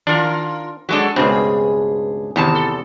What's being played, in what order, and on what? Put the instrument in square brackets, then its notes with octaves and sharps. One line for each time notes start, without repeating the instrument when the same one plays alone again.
[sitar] D#3 F4 A#4 [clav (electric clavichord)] D4
[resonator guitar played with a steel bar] F#3 G#3 D4 [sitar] F#4 A4
[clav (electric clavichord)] C#2 B2 C4 [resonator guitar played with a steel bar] G2 [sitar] D4 G#4
[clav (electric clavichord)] E2 C3 [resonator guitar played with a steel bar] A2 D#3 A5
[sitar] A4